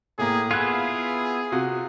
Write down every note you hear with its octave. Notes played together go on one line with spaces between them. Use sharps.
A2 A#3 G#4
B3 E4 F4 G#4 F#6 G#6
C3 F4 F#4